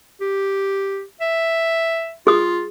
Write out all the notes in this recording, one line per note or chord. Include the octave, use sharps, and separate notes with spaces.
G4
E5
F4 G#4 D#6